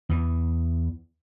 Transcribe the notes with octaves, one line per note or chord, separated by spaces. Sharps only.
E2 E3